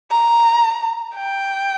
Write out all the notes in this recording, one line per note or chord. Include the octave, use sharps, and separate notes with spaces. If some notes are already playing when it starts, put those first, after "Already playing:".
A#5
G5